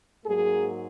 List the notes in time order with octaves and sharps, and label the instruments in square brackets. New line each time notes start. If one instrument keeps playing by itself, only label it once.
[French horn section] G#2 F#3 A#3 G#4